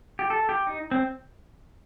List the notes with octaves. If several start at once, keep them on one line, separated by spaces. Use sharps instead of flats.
G4
A4
G4
D#4
C4